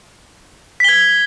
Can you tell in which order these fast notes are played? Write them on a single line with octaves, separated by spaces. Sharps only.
B6 G7 G#6